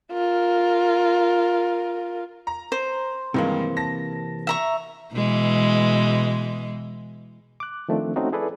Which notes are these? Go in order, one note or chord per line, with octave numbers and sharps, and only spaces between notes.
F4 A#4
A#5
C5
G2 C3 D#3 E3 G#3 A#3
A5 A#6
E5 A#5 C#6
B2 E3 G#3
D6 F#6
D#3 F3 A3 C4 D4
A3 C4 C#4 D#4 F#4
E4 G#4 A4 B4 D5